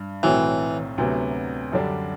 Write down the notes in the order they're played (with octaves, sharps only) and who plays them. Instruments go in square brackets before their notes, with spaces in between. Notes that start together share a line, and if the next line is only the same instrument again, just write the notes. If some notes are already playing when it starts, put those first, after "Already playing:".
Already playing: [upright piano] G2
[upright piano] B1 A2 F#3 C4 [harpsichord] E3
[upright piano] D2 C3 F#3 B3
F#2 D3 G3 D4